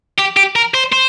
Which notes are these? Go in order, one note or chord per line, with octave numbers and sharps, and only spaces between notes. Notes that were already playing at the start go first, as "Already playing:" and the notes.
G4
G4
A#4
C5
C5